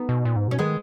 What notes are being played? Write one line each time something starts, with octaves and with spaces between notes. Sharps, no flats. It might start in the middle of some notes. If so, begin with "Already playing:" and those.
Already playing: B3 D#4
B2
A#2
G#2
B2 C#4
D#3 G#3 B3